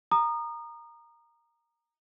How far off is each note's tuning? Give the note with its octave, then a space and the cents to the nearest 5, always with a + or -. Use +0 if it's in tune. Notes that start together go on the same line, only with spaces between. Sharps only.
A#5 +0 D#6 -30